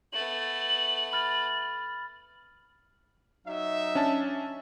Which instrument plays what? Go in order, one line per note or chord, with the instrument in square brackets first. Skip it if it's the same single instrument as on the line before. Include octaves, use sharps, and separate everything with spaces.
[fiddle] A3 B3 [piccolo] F#7
[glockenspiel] B5 F6 A6
[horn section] F#3 D#4 E5
[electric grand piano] C#4 D4 A5